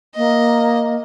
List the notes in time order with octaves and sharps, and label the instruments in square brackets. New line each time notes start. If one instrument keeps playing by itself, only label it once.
[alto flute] A#3 [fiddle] D#5